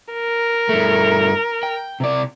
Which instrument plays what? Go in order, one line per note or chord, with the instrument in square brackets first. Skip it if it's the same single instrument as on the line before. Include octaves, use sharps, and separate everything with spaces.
[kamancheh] A#4
[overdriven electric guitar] G2 A3
G5
C3 D5